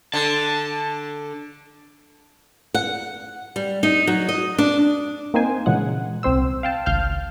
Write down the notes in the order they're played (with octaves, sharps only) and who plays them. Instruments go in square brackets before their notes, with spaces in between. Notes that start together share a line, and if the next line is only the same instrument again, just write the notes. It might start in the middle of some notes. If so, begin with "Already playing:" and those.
[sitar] D3 [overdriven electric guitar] A5
[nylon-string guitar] F#5
G3
D#4
F#3
D#5
D4
[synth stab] A#3 C4 D#4 C5 G#5
A#2 C#3 E3 G#3 F#5
C2 C4 C5 E6
F5 G5 A5
G#1 C#2 F5 F6 G6